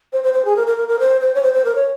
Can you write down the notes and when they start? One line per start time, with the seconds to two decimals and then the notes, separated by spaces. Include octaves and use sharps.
0.13 C5
0.24 C5
0.34 C5
0.45 G#4
0.56 A#4
0.67 A#4
0.77 A#4
0.88 A#4
1.00 C5
1.21 C5
1.34 C#5
1.43 C5
1.54 C5
1.65 A#4
1.75 C#5